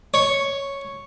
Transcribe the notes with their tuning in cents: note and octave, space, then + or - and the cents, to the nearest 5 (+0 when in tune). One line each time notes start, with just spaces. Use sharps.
C#5 +0